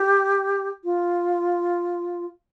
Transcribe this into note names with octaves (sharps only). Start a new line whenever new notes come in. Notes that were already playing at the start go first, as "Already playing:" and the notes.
Already playing: G4
F4